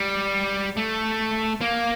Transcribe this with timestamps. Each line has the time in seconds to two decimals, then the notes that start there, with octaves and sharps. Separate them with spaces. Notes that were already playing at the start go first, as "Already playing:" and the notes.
Already playing: G3
0.77 A3
1.61 A#3